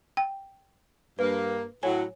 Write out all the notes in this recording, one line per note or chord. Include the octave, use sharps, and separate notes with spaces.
G5
G2 A#3 B4
A2 F#3 C#5 G#5